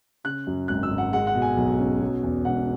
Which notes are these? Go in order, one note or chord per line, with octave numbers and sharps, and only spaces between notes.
C#3 F#6
F#2
G#1 F#6
E6
G#1
F#5
G#3 F#5
F#5
B2
G#5
B1
C#4
B2
E2
E1 F#5